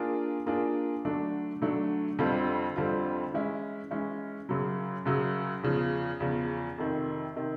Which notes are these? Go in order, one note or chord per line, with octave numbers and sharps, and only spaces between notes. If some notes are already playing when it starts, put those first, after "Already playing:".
Already playing: A#3 D4 F4 G#4
A#3 D4 F4 G#4
D3 F#3 A3 D4
D3 F#3 A3 D4
F2 D3 G3 C4 F4
F2 D3 G3 C4 F4
E3 G#3 C#4 E4
E3 G#3 C#4 E4
F#2 C#3 F#3
F#2 C#3 F#3
E2 C#3 F3
E2 C#3 F3
F2 C3 D#3
C3 D#3